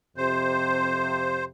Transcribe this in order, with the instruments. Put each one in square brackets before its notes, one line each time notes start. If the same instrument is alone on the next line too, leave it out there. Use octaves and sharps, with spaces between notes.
[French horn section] F2 C3 [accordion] C5